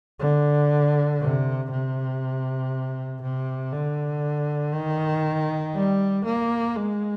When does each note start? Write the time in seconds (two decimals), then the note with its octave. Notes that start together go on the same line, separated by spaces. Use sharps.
0.20 D3
1.20 C3
1.70 C3
3.22 C3
3.73 D3
4.74 D#3
5.75 G3
6.25 A#3
6.76 G#3